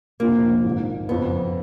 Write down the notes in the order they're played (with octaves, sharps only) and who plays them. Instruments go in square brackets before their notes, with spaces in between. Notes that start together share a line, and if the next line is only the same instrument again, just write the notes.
[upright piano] F1 F2 D3 F3 [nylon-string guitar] A#3
[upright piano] A#1 G#2 D#3
[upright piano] F#1 F2 F3 [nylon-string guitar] B3